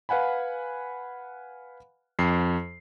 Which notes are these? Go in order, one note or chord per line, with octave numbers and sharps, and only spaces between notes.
B4 F5 F#5 G#5 B5
F2 C7